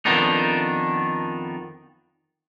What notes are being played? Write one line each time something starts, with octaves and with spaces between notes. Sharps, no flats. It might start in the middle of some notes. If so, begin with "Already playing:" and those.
F2 D#3 B3 D4 D#4